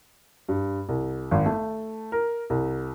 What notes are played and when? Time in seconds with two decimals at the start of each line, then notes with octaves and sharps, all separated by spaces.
0.49 G2
0.89 C2
1.31 G#1
1.46 A3
2.12 A#4
2.50 C2